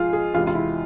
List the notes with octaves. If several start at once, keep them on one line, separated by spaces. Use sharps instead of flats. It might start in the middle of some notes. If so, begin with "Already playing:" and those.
Already playing: G#2 F3 G#3 F4 G#4
G#4
E2 C3 G#3 F4
F4
E4